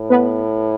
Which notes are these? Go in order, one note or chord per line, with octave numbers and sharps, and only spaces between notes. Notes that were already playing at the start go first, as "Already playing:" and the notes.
Already playing: A2
B3 B4